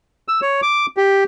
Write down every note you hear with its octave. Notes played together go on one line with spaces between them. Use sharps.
E6
C#5
D6
G4